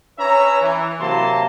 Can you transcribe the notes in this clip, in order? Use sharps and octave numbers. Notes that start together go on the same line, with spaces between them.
C#4 B4 C#5 E5 A#5
E3
C3 F#3 A#3 A5 C6